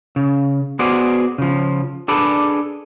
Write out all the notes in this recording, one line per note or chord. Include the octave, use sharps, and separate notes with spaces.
C#3
B3 F#4 G#4 C5 D5
C#3 F3
D4 G#4 A4 B4 D5